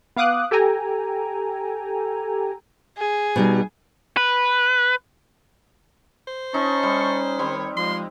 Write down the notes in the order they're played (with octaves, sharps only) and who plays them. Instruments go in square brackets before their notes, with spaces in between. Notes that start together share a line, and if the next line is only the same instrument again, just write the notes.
[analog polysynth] B3 F5 D6 D#6 F#6
G4 A4 G5 G#5 A#5
[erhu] G#4
[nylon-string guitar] B2 G3 D#4
[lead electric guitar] B4
[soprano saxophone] C5
[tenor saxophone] C#4 [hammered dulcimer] D#4 [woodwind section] A5 C#6
[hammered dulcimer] G3
[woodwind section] D#3 C#5 [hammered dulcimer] G3 C4
[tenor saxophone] F3 [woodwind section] G#3 [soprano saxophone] C6